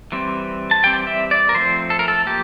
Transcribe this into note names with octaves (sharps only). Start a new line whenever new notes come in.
E3 G3 C4
A5
E3 G3 C4 G5
E5
D5
A#4
F3 A3 C4 C5
A4
A#4
A4
F3 A#3 G4